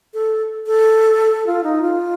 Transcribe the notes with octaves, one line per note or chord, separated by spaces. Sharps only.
A4
A4
F4
D#4
F4